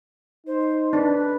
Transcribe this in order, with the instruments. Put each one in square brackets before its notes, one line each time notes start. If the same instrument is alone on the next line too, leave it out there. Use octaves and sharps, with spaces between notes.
[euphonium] D#4 [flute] C5
[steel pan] D4 [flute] B4